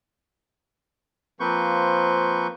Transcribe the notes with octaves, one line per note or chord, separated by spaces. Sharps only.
F3 A#3 C4 B4 C#6 G6